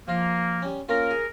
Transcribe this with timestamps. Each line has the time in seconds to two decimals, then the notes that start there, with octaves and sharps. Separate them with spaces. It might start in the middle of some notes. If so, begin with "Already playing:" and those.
0.08 F3 A#3 F4
0.62 G3 C#4
0.89 A#3 C#4 F4 A#4
1.11 G#4